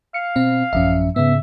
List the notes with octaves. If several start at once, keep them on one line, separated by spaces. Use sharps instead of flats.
F5 C#7
B2 C4
A1 F#2 F3 C#4 E5
G#2 C#3 B3 E5